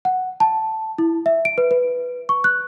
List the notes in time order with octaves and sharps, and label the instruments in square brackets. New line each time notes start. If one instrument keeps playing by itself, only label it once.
[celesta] F#5
A5
E4
E5
D7
B4
B4
C#6
F#6